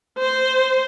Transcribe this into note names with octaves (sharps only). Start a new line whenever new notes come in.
C5